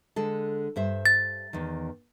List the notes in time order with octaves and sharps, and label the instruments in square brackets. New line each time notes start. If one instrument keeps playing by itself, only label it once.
[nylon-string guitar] D3 G#3 A4
G2 C5 E5
[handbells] A6
[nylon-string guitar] E2 D#3